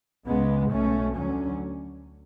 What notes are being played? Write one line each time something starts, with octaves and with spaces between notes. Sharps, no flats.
C#2 C#3 G#3 B3
B1 B2 A3 C#4
D2 D3 F#3 C#4